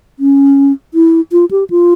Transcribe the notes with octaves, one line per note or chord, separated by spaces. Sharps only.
C#4
E4
F4
G4
F4